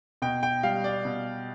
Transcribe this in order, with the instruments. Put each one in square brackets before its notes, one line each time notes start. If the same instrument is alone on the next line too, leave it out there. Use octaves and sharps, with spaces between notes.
[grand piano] B2 G5
G5
G3 F5
D5
B2